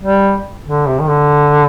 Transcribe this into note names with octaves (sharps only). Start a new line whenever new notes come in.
G3
D3
C3
D#3
D3